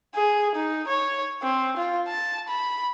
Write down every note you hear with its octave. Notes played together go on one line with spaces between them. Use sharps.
G#4
D#4
C#5
C4
F4
A5
B5